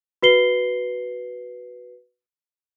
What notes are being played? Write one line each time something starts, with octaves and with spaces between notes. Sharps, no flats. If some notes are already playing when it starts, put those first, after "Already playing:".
F#4 B4 C7 G7